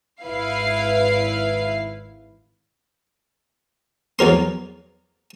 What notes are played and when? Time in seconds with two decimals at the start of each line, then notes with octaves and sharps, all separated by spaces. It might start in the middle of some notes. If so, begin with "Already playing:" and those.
0.23 G#1 E4 B4 F5 C7
4.19 E2 F#3 A#4 C6